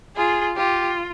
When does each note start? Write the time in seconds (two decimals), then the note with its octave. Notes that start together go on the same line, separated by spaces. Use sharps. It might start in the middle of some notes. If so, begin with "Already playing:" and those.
0.16 F4 G#4
0.57 F4 G4